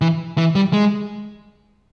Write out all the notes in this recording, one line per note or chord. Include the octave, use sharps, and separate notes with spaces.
E3
E3
G3
G#3